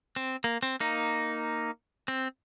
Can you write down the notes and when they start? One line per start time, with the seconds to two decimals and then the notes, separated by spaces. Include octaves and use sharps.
0.16 C4
0.44 A#3
0.63 C4
0.80 A#3 D#4
2.08 C4